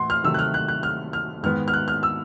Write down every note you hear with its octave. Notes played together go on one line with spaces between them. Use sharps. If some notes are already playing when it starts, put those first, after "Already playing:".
Already playing: A2 E3 F#5 C6
F6
C3 D#3 F#3 A3 E6
F#6
F6
F#6
F#6
F6
F6
G#2 D#3 G#3 B3 F6
F6
F#6
F6
E6